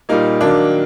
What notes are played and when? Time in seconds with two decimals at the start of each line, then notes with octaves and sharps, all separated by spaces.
0.09 A#2 G3 A#3 D#4
0.41 D#3 F#3 A#3 D4